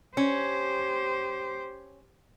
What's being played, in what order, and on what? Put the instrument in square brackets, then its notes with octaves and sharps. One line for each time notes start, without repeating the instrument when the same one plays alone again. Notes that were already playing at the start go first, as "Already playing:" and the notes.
[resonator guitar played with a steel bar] C#4 [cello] G4 C5